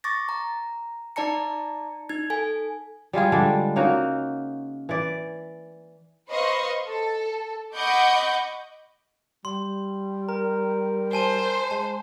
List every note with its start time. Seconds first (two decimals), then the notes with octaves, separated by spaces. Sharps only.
0.04 C#6 D6 A6 A#6
0.29 A#5
1.16 D#4 D5 A5 A#5 C#7
2.09 D#4 G#6
2.30 A4 G#5
3.13 G3 G#3 F4 G#4
3.32 D3 G3 G#3 D4
3.76 C#3 A#3 D#4 F#4
4.89 E3 D5
6.29 B4 C5 D#5 F5 C6 C#6
6.86 A4
7.75 D#5 F#5 B5 C#6 D6 G6
9.45 G3 C6
10.29 A#4 A#5
11.13 C5 G#5 A5 D#7
11.71 G#3 A5